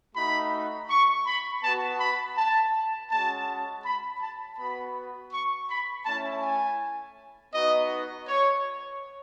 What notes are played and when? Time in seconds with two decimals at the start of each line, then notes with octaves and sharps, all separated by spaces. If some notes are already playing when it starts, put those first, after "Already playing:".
0.15 A3 D#4 F#4 B5
0.90 C#6
1.26 B5
1.63 B3 F#4 A5
2.00 B5
2.37 A5
3.10 G#3 C#4 F#4 A5
3.85 B5
4.21 A5
4.58 B3 F#4 B5
5.32 C#6
5.69 B5
6.06 A3 C#4 E4 A5
6.42 G#5
7.53 B3 D#4 F#4 D#5
8.27 C#5